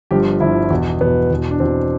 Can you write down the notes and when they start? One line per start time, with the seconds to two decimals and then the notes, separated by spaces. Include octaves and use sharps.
0.11 G1 G2 F3 G4
0.40 G1 G2 F3 E4
0.70 E2 B2
1.00 E2 B2 B3
1.31 E2 B2
1.51 D4
1.60 E2 B2 C4